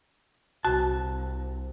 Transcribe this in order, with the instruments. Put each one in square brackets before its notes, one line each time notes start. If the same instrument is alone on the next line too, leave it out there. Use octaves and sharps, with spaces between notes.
[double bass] C2 [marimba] F#4 [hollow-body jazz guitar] A5